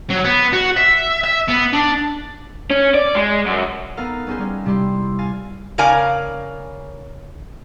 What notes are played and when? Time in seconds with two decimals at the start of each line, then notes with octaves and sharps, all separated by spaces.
0.10 F#3
0.25 B3
0.53 F#4
0.77 E5
1.24 E5
1.49 B3
1.73 D4
2.70 C#4
2.95 D5
3.15 G#3
3.46 F#2
3.97 B3 D#4 A4 A#4 F5
4.27 B3 C#4 D#4 G#4 C5
4.39 G3 C#4
4.65 C3 G3 E4 G4 C6
5.19 F5 G#5 A6
5.78 C#3 A#4 D5 F5 G#5